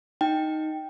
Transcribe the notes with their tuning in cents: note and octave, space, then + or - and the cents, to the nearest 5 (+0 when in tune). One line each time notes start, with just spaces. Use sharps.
D#4 +0 G5 +0